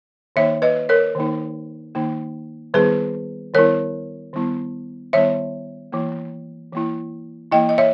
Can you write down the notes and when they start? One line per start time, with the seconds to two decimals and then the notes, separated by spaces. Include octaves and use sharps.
0.36 D#3 A#3 D#4 C#5 E5
0.62 B4 D#5
0.89 A#4 C#5
1.15 D#3 A#3 D#4
1.95 D#3 A#3 D#4
2.74 D#3 G3 B3 E4 G#4 B4
3.54 D#3 G3 B3 E4 A#4 C#5
4.33 D#3 G3 B3 E4
5.13 D#3 G3 B3 E4 C#5 E5
5.92 E3 A#3 E4
6.73 E3 A#3 E4
7.52 E3 A#3 E4 D#5 G5
7.69 D#5
7.78 C#5 E5